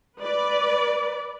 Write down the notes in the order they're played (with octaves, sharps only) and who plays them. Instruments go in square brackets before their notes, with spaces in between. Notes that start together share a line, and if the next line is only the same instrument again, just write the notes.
[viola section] B4 D5